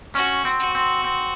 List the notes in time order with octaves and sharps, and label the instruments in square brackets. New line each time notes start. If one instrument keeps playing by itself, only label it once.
[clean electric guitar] C#4 [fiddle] F#4
[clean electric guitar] C4
[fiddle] F#4
[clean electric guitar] C4
C4